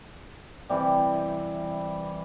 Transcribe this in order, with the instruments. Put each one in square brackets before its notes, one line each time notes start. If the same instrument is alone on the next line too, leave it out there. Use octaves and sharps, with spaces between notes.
[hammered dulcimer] C3 E3 G3